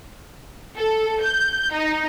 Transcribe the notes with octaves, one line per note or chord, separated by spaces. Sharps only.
A4
G6
D#4